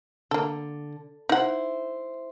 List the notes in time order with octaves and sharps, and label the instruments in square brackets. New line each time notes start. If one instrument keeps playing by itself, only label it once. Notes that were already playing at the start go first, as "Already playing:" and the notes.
[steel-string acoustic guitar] D3 [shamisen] A#3 A4
[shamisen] D#4 F#5 [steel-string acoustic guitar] E4 C5